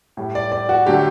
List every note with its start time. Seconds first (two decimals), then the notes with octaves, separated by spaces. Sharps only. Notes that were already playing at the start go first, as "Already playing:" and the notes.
0.17 A2 G3
0.35 D5
0.52 D5
0.69 F#4
0.86 D3 F#3 A3 G4